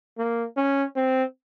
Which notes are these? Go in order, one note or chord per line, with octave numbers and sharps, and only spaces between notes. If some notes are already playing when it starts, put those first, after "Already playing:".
A#3
C#4
C4